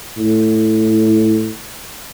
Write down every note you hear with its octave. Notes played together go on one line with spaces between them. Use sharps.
A2